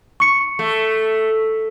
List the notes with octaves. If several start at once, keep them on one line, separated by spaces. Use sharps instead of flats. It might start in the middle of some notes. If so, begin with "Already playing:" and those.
C#6 C#7
A3